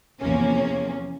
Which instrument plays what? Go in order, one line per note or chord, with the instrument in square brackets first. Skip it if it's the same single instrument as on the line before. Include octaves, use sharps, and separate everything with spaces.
[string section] E2 C3 F3 A#3 C#4